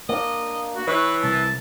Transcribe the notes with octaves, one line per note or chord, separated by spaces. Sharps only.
A#3 D4 D#5
F#4
E3 B4 C#5
C2 A5